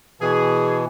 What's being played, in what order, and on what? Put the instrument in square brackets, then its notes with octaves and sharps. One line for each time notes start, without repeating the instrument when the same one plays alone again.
[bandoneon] B2 E3 [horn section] G#4